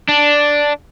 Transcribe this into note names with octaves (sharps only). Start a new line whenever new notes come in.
D4